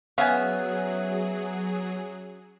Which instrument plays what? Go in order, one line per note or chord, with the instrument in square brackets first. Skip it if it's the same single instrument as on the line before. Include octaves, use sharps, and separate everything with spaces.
[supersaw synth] F#3 G#4 [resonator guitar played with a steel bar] B3 [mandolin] C#4 E5 [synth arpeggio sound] F5 G#5